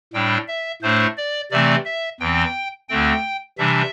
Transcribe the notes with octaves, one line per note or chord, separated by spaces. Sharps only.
A2 G3 D4 G5
E5
A2 A3 D4 C5
D5
C3 E3 A3 C4 D5
E5
E2 E3 C4 G5
D2 D3 A3 C4 G5
C3 E3 G3 D4 E5